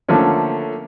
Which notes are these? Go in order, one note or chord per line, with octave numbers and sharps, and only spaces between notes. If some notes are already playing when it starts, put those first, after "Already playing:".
D3 F3 A3 A#3 C#4